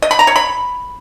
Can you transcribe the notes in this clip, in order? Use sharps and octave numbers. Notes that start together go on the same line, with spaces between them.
D#5
B5
A#5
C#5
B5